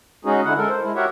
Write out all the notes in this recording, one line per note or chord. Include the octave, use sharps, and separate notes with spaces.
G#3 C#4 D#4 F#4 G#4
D3 E4 F#5
G#3 A4 A#4
C5
G#3 E4
F#4 G4 A#4 C#5 E5 F#5